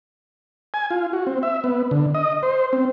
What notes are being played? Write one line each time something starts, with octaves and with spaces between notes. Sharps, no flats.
G#5
F4
F#4
C4
E5
B3
D3
D#5
C5
C4